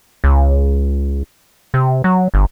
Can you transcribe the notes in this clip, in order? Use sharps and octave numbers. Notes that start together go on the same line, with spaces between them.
C#2
C3
F#3
G1